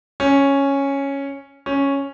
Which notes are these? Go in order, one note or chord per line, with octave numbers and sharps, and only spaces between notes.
C#4
C#4